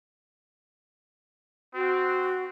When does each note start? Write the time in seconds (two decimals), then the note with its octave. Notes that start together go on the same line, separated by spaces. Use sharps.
1.74 C4 F#4